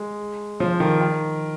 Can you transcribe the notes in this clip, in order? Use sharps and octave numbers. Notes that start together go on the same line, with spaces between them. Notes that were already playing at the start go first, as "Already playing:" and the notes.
Already playing: G#3
F3
D#3
D#3